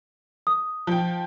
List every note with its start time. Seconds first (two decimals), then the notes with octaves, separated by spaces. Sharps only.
0.47 D#6
0.87 F3 G5